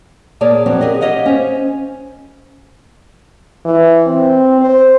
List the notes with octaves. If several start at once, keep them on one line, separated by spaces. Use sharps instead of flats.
A#2 A#3 G#4 C#5 D5 A5
F2 F#3 C4 D4
G4 G#4 A#4 D#5
G4 C#5 D#5 F5 F#5
C#4 C5
E3
C4
C5